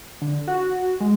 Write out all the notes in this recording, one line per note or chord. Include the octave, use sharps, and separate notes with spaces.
D3
F#4
G#3